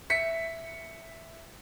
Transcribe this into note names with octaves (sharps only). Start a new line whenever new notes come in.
E5 B6 C#7